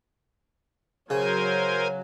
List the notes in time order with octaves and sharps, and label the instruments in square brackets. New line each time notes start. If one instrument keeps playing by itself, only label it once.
[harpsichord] C#3 [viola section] F#3 [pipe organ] A#4 C5 G#5